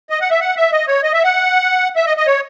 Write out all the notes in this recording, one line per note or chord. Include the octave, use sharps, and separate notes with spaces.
D#5
F#5
E5
F#5
E5
D#5
C#5
D#5
E5
F#5
E5
D#5
D#5
C#5